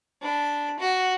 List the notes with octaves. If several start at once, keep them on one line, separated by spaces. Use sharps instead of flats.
D4 B5
F#4